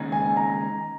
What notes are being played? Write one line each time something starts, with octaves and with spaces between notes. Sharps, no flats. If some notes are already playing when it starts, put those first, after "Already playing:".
Already playing: D#2 C#3 G#3 D#4
G#5
A#5